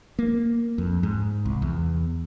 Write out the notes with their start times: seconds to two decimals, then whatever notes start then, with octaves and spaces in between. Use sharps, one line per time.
0.19 A#3
0.78 F2
1.03 G#2
1.45 C2
1.62 E2